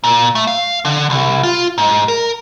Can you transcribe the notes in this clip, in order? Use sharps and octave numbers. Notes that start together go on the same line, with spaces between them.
A#2
A3
F5
D3
C2
F4
G#2
A#4